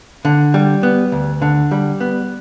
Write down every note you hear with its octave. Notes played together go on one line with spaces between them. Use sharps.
D3
G3
B3
D2
D3
G3
B3